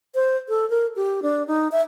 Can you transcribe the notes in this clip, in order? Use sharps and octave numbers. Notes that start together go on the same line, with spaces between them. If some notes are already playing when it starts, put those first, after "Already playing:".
C5
A4
A#4
G4
D4
D#4
E5